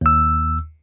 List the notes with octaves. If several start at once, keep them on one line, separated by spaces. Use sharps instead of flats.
D#2 E6